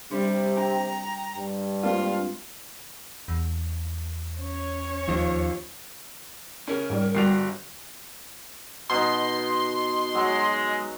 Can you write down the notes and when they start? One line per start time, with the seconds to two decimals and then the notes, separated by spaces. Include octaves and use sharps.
0.12 C3 G3 D4
0.57 D4 G5 A#5
1.37 G2
1.84 G#3 A#3 C4 D4 F4
3.28 E2
4.40 C#4 C#5
5.08 D#2 F3
6.68 C#3 C#4 A#4
6.90 G#2 G3
7.15 G1 G3 F#4 C7 F7
8.90 B2 D#4 C6
10.15 F#3 G#3